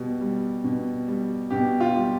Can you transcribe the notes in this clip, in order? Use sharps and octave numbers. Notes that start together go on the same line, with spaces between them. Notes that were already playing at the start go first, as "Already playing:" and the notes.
Already playing: B2 G3
G3
B2
G3
B2 G4
F4
G3